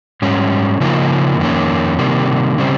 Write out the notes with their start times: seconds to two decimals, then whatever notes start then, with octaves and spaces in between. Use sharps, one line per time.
0.22 G#2 G3 C#4
0.80 C#3 F3 A#3 D#4
1.39 F2 D#3 A#3 C#4
1.98 C3 D#3 G3 A#3
2.58 C#3 G3 C4